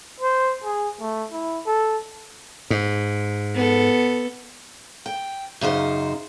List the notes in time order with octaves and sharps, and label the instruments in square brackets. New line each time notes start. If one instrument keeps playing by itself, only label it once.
[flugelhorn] C5
G#4
A3
E4
A4
[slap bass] G#2
[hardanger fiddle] B3 A4
[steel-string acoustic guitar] G5
F#2 C#3 D#4 C5